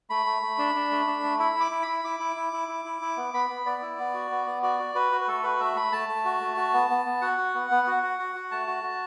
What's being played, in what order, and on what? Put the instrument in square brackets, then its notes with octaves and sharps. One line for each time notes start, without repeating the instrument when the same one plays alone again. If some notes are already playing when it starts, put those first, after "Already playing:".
[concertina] A3 B5
A3
A3
D4
D4
A3
D4
A3
E4 B5
E4 D6
E4
E4 B5
E4 D6
E4
E4
E4
E4
E4
E4
B3
B3 B5
B3
B3 D5
E4
B3
F#4
B3
B3
F#4 D5
F#4
F#4 B4
F#4
B4
A3 A4
F#4 B4
A3 E5
A3 B5
A3 A5
A3
F#4
A3
F#4
B3
B3
B3
F#4 F#5
F#4
B3
B3
F#4
F#4
F#4
F#4
A3 A5
F#4
F#4